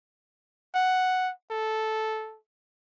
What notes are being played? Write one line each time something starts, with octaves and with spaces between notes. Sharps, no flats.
F#5
A4